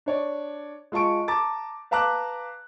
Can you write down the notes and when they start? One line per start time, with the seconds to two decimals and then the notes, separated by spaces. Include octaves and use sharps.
0.06 D4 C#5 D5
0.92 G#3 F4 A5 C#6 D7
1.28 A5 A#5 D6 A6
1.91 B4 F5 A5 A#5 D6 F#6